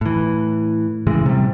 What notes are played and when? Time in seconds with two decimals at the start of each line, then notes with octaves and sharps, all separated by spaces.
0.01 A2 E3
1.07 A2 C#3 E3 G#3
1.26 C3 G3